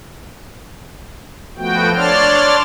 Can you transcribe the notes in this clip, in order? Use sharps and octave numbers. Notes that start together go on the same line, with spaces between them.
F3 A3 B3 F#4 G5
D4 C#5 D5 A5 C6 F6